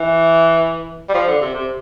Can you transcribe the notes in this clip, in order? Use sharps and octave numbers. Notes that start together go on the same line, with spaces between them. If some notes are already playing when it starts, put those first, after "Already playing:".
Already playing: E3
G3
F3
D3
C3
C3